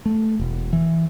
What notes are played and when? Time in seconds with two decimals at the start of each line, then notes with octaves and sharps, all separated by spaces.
0.06 A3
0.39 E1
0.73 E3